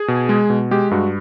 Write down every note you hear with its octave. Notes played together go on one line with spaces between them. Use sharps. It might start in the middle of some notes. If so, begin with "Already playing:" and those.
Already playing: G#4
B2
G#3
B2
G#3 G4
G2 F#4